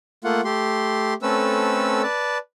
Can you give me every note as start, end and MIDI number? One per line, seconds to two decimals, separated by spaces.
0.24 0.41 57
0.24 0.41 58
0.24 0.41 65
0.24 0.41 78
0.45 1.14 57
0.45 1.14 67
0.45 1.14 84
1.22 2.02 57
1.22 2.02 60
1.22 2.02 61
1.22 2.02 69
1.22 2.02 71
1.22 2.02 88
2.03 2.38 71
2.03 2.38 74
2.03 2.38 81